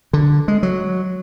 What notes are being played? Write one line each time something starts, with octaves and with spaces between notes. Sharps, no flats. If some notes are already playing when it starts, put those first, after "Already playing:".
D3
G#3
F#3